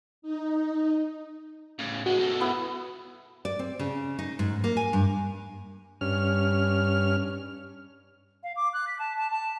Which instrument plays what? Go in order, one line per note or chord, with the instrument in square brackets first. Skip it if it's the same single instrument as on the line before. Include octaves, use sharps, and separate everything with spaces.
[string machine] D#4
[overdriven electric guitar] A2 C#3
[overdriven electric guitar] G#3 B3 [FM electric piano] F#4
[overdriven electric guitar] B2 A3
[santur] B3 E4
[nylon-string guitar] D5
C4
C#3
D#4
G#2
A#3
G#5
G2
[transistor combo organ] G2 C#4 F6
[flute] F5
D6
F#6
B6
A5
A5
A5